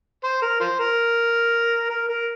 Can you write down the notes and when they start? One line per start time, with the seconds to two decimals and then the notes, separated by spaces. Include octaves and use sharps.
0.24 C5
0.42 A#4
0.60 F4 C5
0.79 A#4
1.90 A#4
2.08 A#4